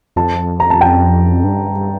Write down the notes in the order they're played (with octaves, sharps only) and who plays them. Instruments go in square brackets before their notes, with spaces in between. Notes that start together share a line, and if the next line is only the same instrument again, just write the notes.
[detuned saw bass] F2 [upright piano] A5
[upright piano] A#5
A5
G5
[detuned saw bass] G2